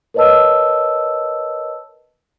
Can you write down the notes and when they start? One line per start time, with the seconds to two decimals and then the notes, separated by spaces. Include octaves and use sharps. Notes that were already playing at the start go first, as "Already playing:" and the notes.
0.14 A#4 B4 C#5 D#5 A5 E6